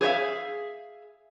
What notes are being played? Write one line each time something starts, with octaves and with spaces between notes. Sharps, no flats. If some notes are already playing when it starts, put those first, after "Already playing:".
G#4 C5 C#5 E5 F5